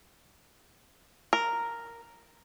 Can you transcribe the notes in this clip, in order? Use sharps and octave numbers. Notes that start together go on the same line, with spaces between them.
A#4